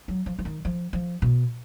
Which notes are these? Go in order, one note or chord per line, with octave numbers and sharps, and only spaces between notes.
F#3
F3
F3
D#3
F3
F3
B2